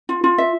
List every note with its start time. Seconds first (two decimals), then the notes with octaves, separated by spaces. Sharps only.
0.09 F4
0.24 F4
0.38 E5